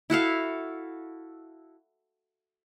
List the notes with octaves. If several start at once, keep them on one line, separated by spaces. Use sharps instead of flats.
E4 F#4 A4 F5